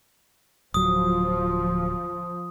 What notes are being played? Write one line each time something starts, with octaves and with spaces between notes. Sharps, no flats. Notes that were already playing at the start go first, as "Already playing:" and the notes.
D1 F3 F#3 D#6